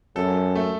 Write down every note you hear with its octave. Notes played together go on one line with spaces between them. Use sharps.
F#2 A4
A3